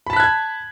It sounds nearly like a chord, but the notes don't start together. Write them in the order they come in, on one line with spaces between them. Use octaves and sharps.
B5 A5 B6 F#6 G#6